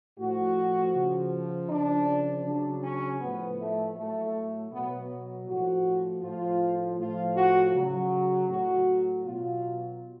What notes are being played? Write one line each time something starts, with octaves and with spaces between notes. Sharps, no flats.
A2 F3 F#4
C#3 F3
C#3 F3 D4
C#3 F#3 D4
C#4
A2 F3 B3
A3
A2 F#3 A3
B2 F#3 B3
A2 F3 F#4
A2 F3 F4
A2 F3 F4
F#4
C#3 F#3
A2 F#3 F#4
B2 F#3 F4